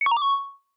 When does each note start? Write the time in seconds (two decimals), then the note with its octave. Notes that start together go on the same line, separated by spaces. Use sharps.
0.01 C#7
0.06 C#6
0.11 A#5
0.17 D6
0.22 C#6